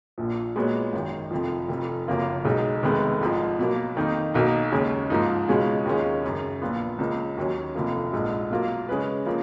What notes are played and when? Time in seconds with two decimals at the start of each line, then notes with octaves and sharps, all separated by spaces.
0.18 A#1 A#2 F3
0.56 A#2 G#3 B3 F#4 C#5
0.93 G#1 F#2 D#3
1.31 F1 F2 F3
1.69 F1 F2 F3
2.08 F#1 F#2 F3 A#3 F4
2.44 B1 B2 G#3 D#4
2.83 F1 F2 D#3 G#3 B3
3.21 G#1 G#2 F3
3.59 B2 F#3 A#3
3.96 F2 D#3 A#3 D#4
4.34 B1 B2 A#3 D#4
4.72 D#2 C#3 G#3 C#4
5.10 G#2 F3 A#3 D#4
5.48 C#2 B2 G#3 C#4 F4
5.85 D#2 D#3 G#3 C#4 F4
6.23 F#2 C#3 F#3
6.62 A#1 A#2 F3 B3 F4
6.98 C#2 C#3 F3 A#3
7.37 D#2 D#3 F#3 C#4
7.75 F1 F2 F3 A#3
8.13 A#1 G#2 F3 G#3
8.51 B2 F#3 A#3 F4
8.89 C#3 G#3 C#4 G#4 B4
9.26 C#3 F3 A#3